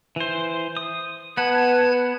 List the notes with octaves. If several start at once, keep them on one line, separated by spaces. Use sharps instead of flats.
E3 C5
D#6
B3 B4 F#5 A5 G#6